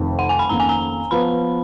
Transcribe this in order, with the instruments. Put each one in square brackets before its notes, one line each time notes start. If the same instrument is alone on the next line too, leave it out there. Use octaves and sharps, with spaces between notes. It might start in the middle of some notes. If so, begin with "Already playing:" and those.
Already playing: [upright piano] F1 F2 D#3
[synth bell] F#5
G#5
B5
[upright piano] F2 D#3 A#3 C#4 [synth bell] A#5
[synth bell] G#5
A#5
[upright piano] F3 B3 [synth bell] B5